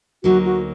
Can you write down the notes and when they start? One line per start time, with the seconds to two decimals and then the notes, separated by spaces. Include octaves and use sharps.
0.24 D2 D3 F#3 A#3 D#4 F#4
0.44 F#4